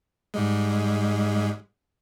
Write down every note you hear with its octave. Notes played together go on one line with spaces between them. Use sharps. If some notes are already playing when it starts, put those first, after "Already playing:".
G#2 G3 G#3